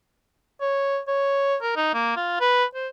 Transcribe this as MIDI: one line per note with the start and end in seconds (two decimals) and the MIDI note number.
0.61 0.99 73
1.08 1.56 73
1.62 1.75 70
1.76 1.89 63
1.94 2.15 58
2.16 2.38 65
2.40 2.65 71
2.75 2.88 72